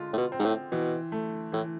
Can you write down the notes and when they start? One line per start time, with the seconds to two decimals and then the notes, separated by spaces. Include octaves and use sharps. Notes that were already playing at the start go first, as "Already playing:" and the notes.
Already playing: D3 G#3 F4
0.13 A2
0.17 B2
0.32 C4
0.39 G#2
0.45 A2
0.71 B2 E3
1.12 A3
1.52 A2 E3